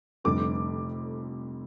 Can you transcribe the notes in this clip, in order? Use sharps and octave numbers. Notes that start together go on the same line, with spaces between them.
F1 F2 D3 G3 C4 D6